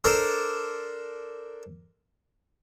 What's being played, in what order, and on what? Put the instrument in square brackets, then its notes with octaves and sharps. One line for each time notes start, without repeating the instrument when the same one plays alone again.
[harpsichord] D4 A4 A#4 C5